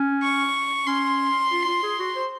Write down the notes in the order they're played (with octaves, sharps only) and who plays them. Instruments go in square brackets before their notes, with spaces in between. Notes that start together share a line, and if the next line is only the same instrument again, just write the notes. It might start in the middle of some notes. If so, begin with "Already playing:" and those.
Already playing: [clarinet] C#4
[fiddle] C#6
[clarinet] C#4 [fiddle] C6
[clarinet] F4
F4
G#4
F#4
C5